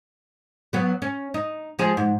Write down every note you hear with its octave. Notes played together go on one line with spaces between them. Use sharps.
F#3 B3
C#4
D#4
F3 G#3 G#4
G#2